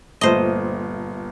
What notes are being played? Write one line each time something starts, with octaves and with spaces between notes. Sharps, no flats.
G1 A#2 A3 C5 D#5